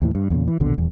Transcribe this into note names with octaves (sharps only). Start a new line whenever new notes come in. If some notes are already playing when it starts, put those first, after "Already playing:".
D#2 A2 E3
G2
E2 G2 A#2 C#3
E3
A#1 D#2 B2 D3
D#1 E2